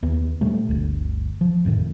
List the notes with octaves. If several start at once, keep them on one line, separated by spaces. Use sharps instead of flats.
D#2 B3
A#2 G3 A3
G1 D2
F3
G#1 F2 A2 D#3